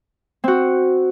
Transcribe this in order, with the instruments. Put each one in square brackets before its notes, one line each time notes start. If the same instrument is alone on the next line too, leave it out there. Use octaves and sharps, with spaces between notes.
[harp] C4 F#4